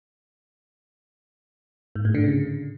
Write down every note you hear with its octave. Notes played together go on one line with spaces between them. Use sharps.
G#2
A2
D3
C#3